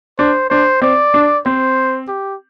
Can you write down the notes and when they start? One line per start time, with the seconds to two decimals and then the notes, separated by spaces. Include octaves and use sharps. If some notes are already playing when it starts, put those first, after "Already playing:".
0.19 D4 C5
0.50 D4 C5
0.82 C4 D5
1.14 D4
1.46 C4 C5
2.08 G4